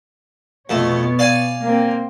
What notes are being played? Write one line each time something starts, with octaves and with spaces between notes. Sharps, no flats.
F2 B2 A3 B3 C#5
D5 F5 G#5
A#3 C4